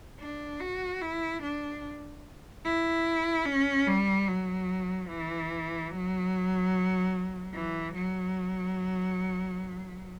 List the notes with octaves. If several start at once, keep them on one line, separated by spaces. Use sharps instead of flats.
D4
F#4
E4
D4
E4
C#4
G3
F#3
E3
F#3
E3
F#3